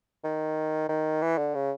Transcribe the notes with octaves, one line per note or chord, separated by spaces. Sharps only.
D#3
D#3
E3
D3
C#3